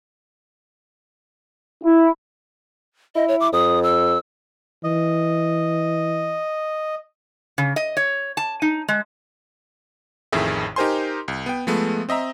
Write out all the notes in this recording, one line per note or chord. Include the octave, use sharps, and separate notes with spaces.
E4
E4 D#5
C#5
D6
F2 D#6
E6
E3 D#5
C#3
D#5
C#5
A5
D#4
G#3
A1 F2 A2 D#3 G#4 E5
D#4 G4 A#4 C5 G#5 C6
C2
B3 G5
F3 G#3 A3 B3
C4 D#5 E5 A#5